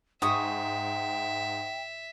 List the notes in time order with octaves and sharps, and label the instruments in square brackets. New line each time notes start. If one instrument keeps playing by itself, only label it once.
[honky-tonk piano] G#2 [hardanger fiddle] E5 [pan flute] G5 [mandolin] G#5 C#6 D#6